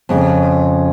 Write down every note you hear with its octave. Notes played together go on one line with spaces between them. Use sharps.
F2 C#3